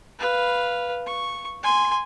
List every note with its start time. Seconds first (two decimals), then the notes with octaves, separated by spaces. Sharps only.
0.19 B4 F5
1.06 C#6
1.63 G#5 C6